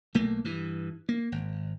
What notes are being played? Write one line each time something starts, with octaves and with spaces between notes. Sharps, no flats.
B1 A3 A#3
G2 E3
A#3
G#1